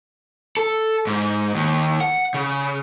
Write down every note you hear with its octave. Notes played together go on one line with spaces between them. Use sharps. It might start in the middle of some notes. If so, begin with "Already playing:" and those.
A4
G#2
D#2
F#5
C#3